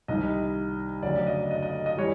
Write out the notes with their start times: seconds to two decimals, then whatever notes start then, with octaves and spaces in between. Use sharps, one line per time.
0.08 C2 C3 D#3 G3 D#5
1.03 D2 C#3 F#3 D5
1.27 D#5
1.51 D#5
1.63 D#5
1.86 D#5
1.98 E3 G3 C#5